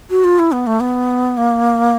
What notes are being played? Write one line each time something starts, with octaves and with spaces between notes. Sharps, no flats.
F#4
F4
E4
B3
A3
B3
A#3